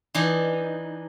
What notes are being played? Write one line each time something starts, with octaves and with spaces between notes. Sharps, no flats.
E3 D4 D#4